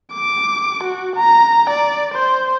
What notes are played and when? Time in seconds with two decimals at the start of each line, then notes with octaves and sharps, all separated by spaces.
0.14 D6
0.84 F#4
1.16 A#5
1.70 D5
2.14 C5